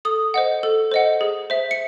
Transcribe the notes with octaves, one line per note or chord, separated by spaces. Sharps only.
A4 D#6
C5 D#5 F#5
A4
C5 D#5 F#5
G#4
C5 E5
C#7